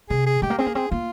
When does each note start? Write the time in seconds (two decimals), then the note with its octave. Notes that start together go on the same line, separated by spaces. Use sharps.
0.10 C3 G#4
0.26 G#4
0.42 G#3 G4
0.50 A#3
0.58 C4 G#4
0.66 A#3
0.75 C4 G#4
0.91 A#3 F4